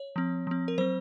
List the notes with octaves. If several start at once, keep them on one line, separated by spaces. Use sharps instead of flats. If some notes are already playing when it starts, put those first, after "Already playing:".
Already playing: C#5
F3 C4
F3 C4
A#4
F#3 C4 C5